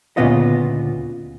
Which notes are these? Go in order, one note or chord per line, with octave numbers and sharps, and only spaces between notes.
D2 A#2 C#3 B3 F4 D#5